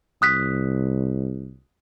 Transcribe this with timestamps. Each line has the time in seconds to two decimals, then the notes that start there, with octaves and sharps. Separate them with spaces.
0.22 C2 D#6 F#6 B6